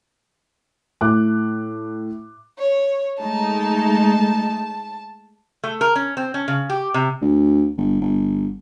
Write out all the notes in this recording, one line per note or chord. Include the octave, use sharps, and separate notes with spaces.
A2 D6 F#6
C#5
G#3 A3 D#4 A5
A3
A#4
C#4
C4
C#4
C#3
G4
C3
D2
G1
G1